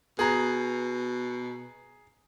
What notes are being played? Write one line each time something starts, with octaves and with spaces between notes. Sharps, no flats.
B2 G#4 A#5